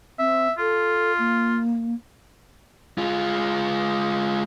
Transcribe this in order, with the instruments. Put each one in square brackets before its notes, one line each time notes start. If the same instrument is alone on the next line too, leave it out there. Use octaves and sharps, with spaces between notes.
[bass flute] C4 [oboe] E5
[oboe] F4 [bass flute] A4
[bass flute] A#3
[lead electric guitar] G#3 F4